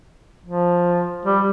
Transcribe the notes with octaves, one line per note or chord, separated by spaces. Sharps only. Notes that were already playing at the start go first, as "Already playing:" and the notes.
F3
G3